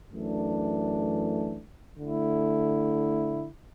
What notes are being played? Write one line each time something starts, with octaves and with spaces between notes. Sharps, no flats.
F#2 E3 A3 D4
D3 A3 E4